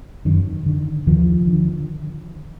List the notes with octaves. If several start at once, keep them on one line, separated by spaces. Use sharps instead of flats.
F#2 D#3
D3
D#2 D#3 F3
D3